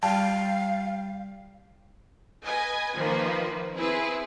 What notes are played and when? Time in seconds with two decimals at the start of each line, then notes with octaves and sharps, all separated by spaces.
0.03 G3 F5 G5 A5
2.45 B4 D#5 G#5
2.95 D#3 F3 A#3 B4
3.75 C4 E4 G#4 B4